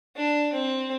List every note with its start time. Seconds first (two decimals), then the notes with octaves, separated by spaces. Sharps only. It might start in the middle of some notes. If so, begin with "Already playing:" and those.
0.16 D4
0.53 C4